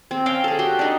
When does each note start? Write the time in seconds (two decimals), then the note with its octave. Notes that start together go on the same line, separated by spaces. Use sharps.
0.11 C4
0.26 C#4 F5 G5 A#5
0.44 G#4 A4
0.59 F#4 G4 G5 C6
0.79 D4 D#4